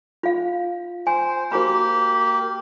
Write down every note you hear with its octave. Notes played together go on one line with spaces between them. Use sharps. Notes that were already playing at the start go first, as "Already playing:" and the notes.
F4 F5
C5 G#5
A#3 F#4 G4 B5